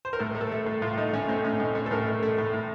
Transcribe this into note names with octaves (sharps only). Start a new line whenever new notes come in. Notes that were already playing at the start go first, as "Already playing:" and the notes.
C5
A#4
A2 A4
A3
A4
A3
A2
A2 F4
A3 D#4
A3 C#4
A2 C4
A2 C#4
A2 D#4
A3 C#4
A4
A2 A#4
A3
A3
A2
A2